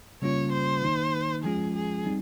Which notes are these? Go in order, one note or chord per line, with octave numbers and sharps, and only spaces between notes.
C#3 G3 A#3 C#4 F4 C#5
C5
D#3 A#3 D#4
F3 G#3 C#4 F4 G#4
G#4
G3 C4 D#4